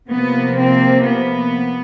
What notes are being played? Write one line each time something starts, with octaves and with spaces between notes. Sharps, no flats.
C3 F3 A#3 B3
C4
B3